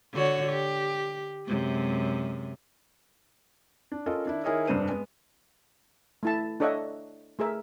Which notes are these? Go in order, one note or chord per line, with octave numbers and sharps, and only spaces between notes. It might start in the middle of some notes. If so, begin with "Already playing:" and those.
D3 F#4 C#5
G4
F#2 C3 G#3
D4
C#4 F4 A4 A#4 D#5
D#3 D4 E4
D#3 E4 G#4 A#4 C#5 D#5
F1 G2 D4 C5 D#7
G#3 B3
A3 E4 A5
D4 A4 C#5 D#5 E5 F#5
A3 G#4 A#4 E5